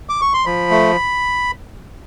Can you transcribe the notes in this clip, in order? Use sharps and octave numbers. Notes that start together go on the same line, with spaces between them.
D6
C#6
C6
F3 B5
A3